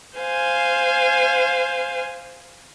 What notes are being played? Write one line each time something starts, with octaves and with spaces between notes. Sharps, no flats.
C5 F5 G#5